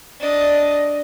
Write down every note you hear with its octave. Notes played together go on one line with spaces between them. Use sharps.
D4 D#5